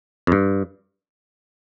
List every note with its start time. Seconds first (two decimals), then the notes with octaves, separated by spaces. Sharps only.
0.27 F2
0.32 G2